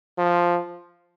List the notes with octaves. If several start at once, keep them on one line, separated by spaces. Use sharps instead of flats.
F3